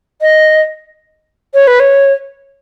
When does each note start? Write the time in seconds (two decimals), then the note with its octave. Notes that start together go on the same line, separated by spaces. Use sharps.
0.21 D#5
1.54 C#5
1.67 B4
1.80 C#5